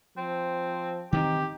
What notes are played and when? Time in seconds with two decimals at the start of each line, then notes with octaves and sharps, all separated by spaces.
0.18 F3 C4
1.13 D#3 E3 C4 D#4 G4